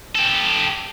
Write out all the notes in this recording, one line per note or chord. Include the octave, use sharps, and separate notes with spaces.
G4 A4